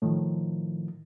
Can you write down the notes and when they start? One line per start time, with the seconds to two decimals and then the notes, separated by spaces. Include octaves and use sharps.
0.02 A2 D#3 F3